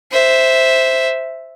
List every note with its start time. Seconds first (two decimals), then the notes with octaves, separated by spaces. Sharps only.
0.12 C5 E5